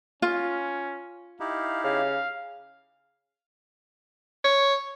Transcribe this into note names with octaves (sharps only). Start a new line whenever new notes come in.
C#4 F4
D#4 E4 G4 F5
C#3 F5
C#5